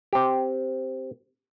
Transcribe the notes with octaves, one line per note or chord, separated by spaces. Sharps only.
C4 G4